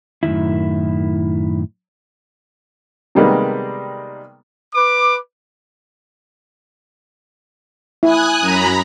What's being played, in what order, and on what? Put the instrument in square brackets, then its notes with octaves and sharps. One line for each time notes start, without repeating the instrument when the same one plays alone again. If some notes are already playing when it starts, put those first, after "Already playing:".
[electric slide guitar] F#2 A2 C3 D#3 E4
[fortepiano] C3 D#3 G3 G#3 A#3 B3
[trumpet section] B4 D6
[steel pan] E4 [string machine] G#5 D#6 F#6
[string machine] F#2 A#5 B5